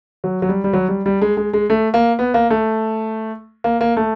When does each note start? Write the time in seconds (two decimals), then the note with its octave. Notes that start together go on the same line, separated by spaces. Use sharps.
0.24 F#3
0.42 F#3
0.49 G3
0.64 G3
0.73 F#3
0.88 G3
1.06 G3
1.22 G#3
1.37 G#3
1.53 G#3
1.70 A3
1.94 A#3
2.19 B3
2.34 A#3
2.50 A3
3.64 A#3
3.81 A#3
3.97 A3